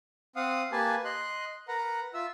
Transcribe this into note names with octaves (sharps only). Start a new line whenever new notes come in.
C4 F5 F#5 D#6
A#3 G4 B4 G#5 A5
D#5 C6 F#6
A#4 B4 F#5 A#5
F4 E5 E6